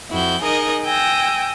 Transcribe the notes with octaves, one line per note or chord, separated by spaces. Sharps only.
F2 E4 F#4 G6
D#4 G#4 A#4 D#5
G5 G#5 E6 G6 A#6